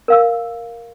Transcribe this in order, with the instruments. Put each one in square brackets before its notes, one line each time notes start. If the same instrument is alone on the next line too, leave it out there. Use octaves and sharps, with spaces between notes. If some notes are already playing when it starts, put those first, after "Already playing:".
[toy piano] A#4 F5 E6